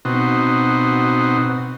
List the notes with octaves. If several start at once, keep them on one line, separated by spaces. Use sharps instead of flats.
B2 C4 D#4 F#4